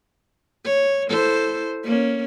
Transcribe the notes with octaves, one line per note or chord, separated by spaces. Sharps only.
C#5
E4 A4 C5
A#3 C#4